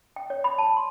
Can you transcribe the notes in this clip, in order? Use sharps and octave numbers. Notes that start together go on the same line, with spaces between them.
G5
C#5
B5
A5
C6